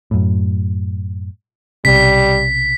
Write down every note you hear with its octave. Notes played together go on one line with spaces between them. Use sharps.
F#2 A2
B1 C3 G3 B6